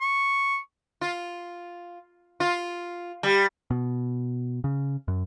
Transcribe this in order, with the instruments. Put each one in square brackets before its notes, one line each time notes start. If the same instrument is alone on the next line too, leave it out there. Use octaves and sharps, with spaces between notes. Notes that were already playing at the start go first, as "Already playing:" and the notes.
[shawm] C#6
[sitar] F4
F4
G3
[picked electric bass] B2
C#3
F#2